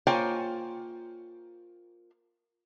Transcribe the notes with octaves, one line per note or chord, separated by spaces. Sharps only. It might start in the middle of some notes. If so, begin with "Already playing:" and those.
A#3 F4 C5 C#5 G5 G#5